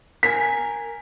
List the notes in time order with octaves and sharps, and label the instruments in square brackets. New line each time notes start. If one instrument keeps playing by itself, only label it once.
[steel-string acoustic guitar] A#4 G#5 [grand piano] B6